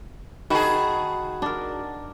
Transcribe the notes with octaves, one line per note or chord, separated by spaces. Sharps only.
D#3 F#4 G#4 A5 B5
D4 A#4